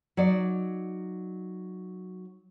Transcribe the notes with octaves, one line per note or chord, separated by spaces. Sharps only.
F#3 D#4 D5